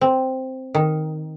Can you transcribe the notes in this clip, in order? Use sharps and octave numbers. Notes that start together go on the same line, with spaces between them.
C4
D#3